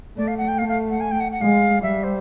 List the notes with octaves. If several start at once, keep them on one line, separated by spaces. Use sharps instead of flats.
A3 D5
F5
F#5
G5
A3 F5
F5
F#5
G#5
G5
F#5
F#5
G#3 F5
G3 E5
C5